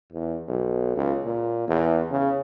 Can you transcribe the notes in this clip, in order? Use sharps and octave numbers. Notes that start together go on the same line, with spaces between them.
E2
B1
C#2
A#2
E2
C#3